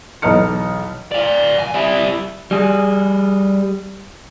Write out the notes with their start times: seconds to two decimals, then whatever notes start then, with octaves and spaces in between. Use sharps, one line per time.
0.22 B1 E2 D#5 F6 C#7
1.12 D5 F5
1.58 C2 G#5
1.74 G3 E4
2.51 G3 G#4